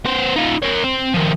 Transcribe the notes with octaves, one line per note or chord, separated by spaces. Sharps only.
B3 C5
D#4 F4
A#4 C#5
C4
D#3 F3